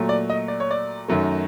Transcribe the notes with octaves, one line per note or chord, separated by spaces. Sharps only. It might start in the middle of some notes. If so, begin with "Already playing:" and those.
Already playing: A#2 F#3 A3
D5
D#5
D5
C#5
D5
F#2 D#3 F#3 A3